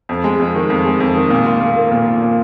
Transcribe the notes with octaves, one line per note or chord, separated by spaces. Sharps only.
F2
G#3
F2
D#3
F2
G#3
F2
D#3
A#2
F4
A#2
A#3
A#2
F4
A#2